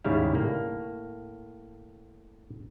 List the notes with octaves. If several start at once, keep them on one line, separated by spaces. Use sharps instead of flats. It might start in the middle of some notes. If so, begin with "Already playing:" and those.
D#2 G#2 C#3 G3 E4 F5
A2 A#3